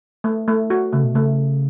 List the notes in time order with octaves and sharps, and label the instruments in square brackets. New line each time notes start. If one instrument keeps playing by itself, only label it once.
[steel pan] A3
A3
F#4
[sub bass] C#3 [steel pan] A3
[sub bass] B2
[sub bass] C#3 [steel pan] A3